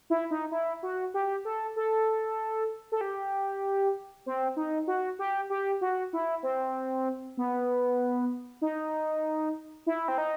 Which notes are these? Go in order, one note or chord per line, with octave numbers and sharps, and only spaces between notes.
E4
D#4
E4
F#4
G4
A4
A4
A4
G4
C4
D#4
F#4
G4
G4
F#4
E4
C4
B3
D#4
E4
C4
D#4